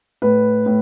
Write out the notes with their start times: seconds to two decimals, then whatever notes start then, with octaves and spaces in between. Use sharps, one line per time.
0.22 A2 B4
0.66 A2